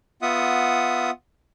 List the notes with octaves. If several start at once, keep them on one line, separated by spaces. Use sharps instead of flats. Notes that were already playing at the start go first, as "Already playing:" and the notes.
B3 F4 E5 F#5 D#6